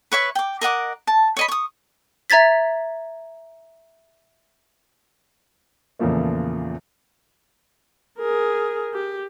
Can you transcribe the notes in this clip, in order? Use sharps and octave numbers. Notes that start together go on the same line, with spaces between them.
B4 C#5 E5 C#6
G5 D6
A#4 D#5 F#5 D6
A5
C#5 D#5 B5
C#6 D#6
E5 A#5 G#6 A6 B6
E2 A#2 C#3 F3 A3 A#3
G#4 A#4
G4